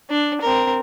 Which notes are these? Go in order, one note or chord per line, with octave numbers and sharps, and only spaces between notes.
D4
C4 A#4